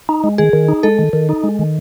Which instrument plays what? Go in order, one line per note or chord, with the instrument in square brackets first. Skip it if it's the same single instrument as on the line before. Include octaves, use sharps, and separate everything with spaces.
[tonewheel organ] D#4
G#3
[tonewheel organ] D#3 [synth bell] G#4
[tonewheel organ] D#3
D#4
[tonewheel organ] G#3 [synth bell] A4
[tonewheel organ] D#3
D#3
D#4
G#3
D#3